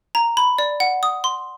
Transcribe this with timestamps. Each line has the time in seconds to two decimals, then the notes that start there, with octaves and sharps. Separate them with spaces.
0.15 A#5
0.37 B5
0.58 D5
0.80 F#5
1.03 D#6
1.24 C6